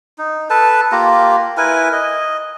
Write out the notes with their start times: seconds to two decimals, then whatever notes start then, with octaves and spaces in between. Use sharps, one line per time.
0.18 D#4
0.50 A4 B4 A5
0.92 A#3 F4 G4 A#5
1.57 E4 A#4 B4 G#5
1.92 D#5